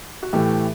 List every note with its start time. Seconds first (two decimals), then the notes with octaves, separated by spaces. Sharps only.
0.23 F#4
0.33 A2 E3 A3 G4